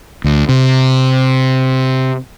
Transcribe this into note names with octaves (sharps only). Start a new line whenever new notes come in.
D2
C3